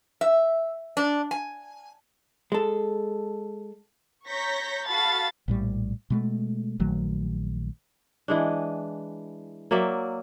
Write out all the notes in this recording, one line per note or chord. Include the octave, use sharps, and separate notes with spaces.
E5
D4
G#5
G#3 A4
C#5 A#5 C#6 G6 A#6 B6
F#4 A4 F5 A5 B5 A6
A#1 A2 G3
B2 G#3 A3
A#1 D#3 F#3 A3
E3 G#3 D4
F#3 A#3 D5 E5